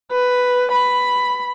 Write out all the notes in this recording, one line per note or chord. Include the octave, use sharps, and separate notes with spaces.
B4
B5